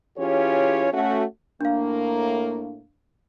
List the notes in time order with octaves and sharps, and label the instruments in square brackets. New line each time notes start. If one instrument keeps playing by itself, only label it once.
[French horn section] E3 C#4 F4 G4 G#4 C#5
A3 C#4 F#4
[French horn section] A2 A#3 [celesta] D4 F5